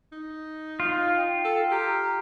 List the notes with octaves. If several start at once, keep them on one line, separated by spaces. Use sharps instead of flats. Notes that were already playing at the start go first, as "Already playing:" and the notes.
D#4
F4
G5
A4
G4 A#5